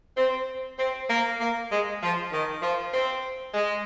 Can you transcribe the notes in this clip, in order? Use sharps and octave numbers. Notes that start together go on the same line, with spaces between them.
C4
C4
A#3
A#3
G#3
F3
D#3
F3
C4
G#3